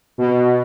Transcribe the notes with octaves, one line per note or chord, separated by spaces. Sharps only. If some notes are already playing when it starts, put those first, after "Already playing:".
B2